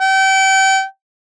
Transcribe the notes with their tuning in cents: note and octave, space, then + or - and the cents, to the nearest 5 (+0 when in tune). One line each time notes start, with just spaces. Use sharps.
G5 -30